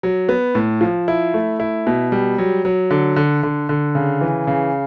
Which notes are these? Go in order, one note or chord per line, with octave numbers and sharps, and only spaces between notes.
F#3
B3
A2
F3
E4
A3
E4
B2
G3
F#3
F#3
D3
D3
D3
D3
C#3
E3
C#3